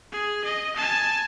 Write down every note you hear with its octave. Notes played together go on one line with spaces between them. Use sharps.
G#4
D#5
G#5 A5